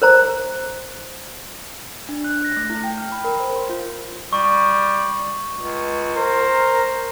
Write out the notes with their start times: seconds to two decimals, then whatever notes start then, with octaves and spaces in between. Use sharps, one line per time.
0.02 A#4 C5 A#5
2.09 D4
2.24 F#6
2.44 A#6
2.56 A3
2.70 E4
2.84 G5
2.98 F6
3.12 B5
3.24 A#4
3.40 C5
3.56 C6
3.69 F4
4.33 G3 C#6
5.58 C#2
6.16 A#4 C5